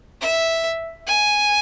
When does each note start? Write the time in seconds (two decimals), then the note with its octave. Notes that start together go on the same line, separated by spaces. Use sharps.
0.21 E5
1.07 G#5